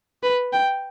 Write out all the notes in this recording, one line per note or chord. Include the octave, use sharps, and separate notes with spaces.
B4
G5